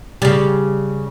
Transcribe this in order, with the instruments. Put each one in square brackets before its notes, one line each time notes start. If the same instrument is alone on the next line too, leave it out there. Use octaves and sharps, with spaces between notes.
[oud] C#3 G3